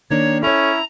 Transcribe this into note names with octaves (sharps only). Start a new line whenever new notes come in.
D#3 A#3 D4 C#5
C#4 E4 A4 C#5 A#5